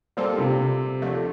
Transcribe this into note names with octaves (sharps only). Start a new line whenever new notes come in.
A#2 G3 A#3 C4 F4 A4
C3
D#2 D3 F3 A3